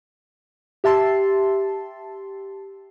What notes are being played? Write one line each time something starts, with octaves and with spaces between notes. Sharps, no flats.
G4 E5 A5 C6